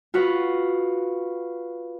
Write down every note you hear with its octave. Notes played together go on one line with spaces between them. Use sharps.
F4 F#4 B4